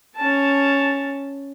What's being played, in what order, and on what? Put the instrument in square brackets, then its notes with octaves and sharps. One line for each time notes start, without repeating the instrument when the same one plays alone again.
[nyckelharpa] C#4 A5